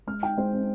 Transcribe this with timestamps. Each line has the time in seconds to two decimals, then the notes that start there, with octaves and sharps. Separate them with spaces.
0.07 G#3 F6
0.23 D#4 G5
0.38 G#3 C5
0.53 C4